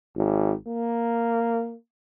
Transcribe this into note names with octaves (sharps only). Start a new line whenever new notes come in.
G#1
A#3